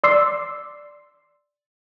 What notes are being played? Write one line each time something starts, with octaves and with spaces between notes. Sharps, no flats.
D5 C6 D6 E6 C7